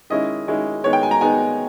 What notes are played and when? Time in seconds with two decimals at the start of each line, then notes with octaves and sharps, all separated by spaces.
0.10 D#3 G#3 C#4 E4 D#5
0.48 D#3 G#3 C#4 E4
0.84 D#3 G#3 B3 C#5
0.93 G5
1.03 G#5
1.11 A#5
1.21 D#3 G#3 B3 G#5